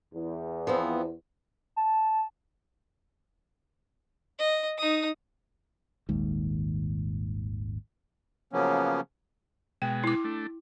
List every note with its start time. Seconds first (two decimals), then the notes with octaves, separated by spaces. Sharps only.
0.14 E2
0.67 F3 B3 C4
1.76 A5
4.39 D#5
4.78 D#4 D#6
6.09 D#1 G#1 D#2 G#2
8.53 C#3 F3 F#3 A#3 B3 C#4
9.82 B2 G#3 G5
10.04 E4 D6
10.24 A3 D4